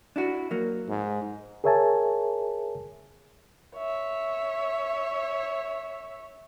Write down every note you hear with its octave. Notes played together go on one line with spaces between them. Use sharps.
D4 E4 F#4
F#3 A#3
G#2
G#4 A#4 C#5 E5 G#5 A5
C#5 E5